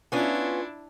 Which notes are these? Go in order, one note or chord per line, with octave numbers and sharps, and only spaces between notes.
B3 C#4 D4 E4 F4